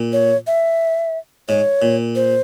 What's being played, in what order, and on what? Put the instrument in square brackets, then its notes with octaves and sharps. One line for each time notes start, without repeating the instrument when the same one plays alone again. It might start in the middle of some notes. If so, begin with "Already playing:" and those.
Already playing: [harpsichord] A#2
[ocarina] C#5
E5
[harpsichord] G#2 [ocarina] C#5
[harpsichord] A#2
[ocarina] C5